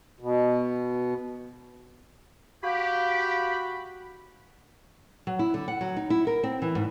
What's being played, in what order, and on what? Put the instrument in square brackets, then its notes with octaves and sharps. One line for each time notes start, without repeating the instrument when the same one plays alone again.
[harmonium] B2
[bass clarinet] F#4 [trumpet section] G4 [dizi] F5 [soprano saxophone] B5
[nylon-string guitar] F#3
E4
D3
F#5
F#3
D#4
E4
A#4
C4
E3
G#2